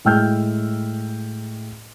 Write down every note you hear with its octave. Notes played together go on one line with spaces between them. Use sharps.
A2 G#3 G5 E6 F6 G6